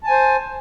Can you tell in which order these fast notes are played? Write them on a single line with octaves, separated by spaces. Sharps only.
A5 G#5 C5